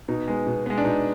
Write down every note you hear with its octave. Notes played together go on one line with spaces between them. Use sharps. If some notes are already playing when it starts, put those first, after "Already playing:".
B2 D#4
G#3 B3
B2
G#3 B3
D4
B2 D#4